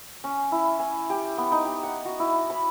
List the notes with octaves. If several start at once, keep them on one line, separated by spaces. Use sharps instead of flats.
C#4
E4
G#5
G4
B3
D#4
G4
F#5
F#4
E4
B5